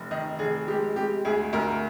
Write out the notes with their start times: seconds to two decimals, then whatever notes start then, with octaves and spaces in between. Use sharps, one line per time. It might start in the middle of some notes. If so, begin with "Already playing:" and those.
Already playing: F1
0.11 D#3 D#5
0.39 F1 G#4
0.68 G#3 G4
0.96 G#3 G4
1.25 D2 G#4
1.53 D2 A#4